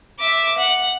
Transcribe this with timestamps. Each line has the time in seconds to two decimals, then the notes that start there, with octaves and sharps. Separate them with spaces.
0.19 E5 D6
0.58 F#5